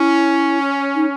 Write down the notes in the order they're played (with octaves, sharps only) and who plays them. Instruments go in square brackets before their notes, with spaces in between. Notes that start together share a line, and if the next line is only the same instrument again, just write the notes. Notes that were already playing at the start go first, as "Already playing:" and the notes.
Already playing: [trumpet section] C#4 [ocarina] E4
[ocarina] D#4